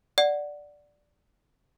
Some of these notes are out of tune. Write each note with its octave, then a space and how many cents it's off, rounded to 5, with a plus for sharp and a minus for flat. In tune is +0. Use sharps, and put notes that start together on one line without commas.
D5 +0 F#5 +0